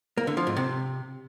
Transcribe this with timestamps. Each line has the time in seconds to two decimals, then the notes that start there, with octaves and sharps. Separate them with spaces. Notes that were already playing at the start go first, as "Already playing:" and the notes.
0.17 A#3
0.27 D3
0.37 F3
0.47 G#2
0.56 C3